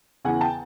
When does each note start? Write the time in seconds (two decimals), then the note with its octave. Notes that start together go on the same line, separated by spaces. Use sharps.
0.25 E2 C#3 E3 F#5 G#5
0.41 G5 A5